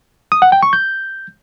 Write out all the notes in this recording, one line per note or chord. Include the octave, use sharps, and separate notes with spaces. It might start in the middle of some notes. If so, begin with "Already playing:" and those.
D#6
F#5
G5
C#6
G6